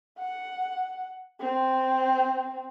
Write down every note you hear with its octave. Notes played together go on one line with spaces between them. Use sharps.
F#5
C4